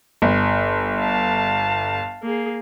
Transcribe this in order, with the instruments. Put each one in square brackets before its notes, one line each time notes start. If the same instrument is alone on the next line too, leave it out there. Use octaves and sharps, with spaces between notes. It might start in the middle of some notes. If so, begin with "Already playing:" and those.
[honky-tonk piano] G1
[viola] F5 A5
A#3 G#4